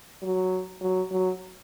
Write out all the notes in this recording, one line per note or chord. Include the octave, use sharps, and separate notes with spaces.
F#3
F#3
F#3